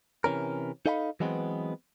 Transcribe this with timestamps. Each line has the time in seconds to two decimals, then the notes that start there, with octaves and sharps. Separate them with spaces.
0.24 C3 E3 C#4 A#4
0.86 D#4 A4 D#5 F5 G5 B5
1.20 E3 F#3 G#3 B3 C4